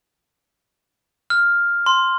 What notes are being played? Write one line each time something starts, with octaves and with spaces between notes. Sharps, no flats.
F6
C6